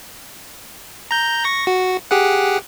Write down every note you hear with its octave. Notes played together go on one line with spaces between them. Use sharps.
A#5 G6
C#6 A#6
F#4
G4 G#4 F#5